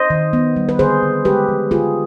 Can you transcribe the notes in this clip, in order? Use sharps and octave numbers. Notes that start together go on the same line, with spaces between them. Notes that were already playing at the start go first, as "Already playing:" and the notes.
Already playing: C5 D#5
D#3
B3
G3
B4
D3 G#4 C5
D3
G#3 G4 B4
F3
D3 F4 G#4